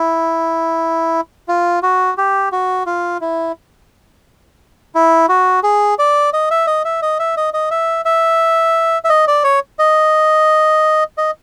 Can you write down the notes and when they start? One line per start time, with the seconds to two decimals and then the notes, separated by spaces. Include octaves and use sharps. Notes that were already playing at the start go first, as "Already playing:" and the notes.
Already playing: E4
1.48 F4
1.83 F#4
2.18 G4
2.52 F#4
2.86 F4
3.21 E4
4.95 E4
5.29 F#4
5.63 G#4
5.99 D5
6.33 D#5
6.51 E5
6.67 D#5
6.85 E5
7.02 D#5
7.19 E5
7.37 D#5
7.54 D#5
7.71 E5
8.05 E5
9.04 E5
9.10 D#5
9.28 D5
9.44 C#5
9.79 D#5
11.18 D#5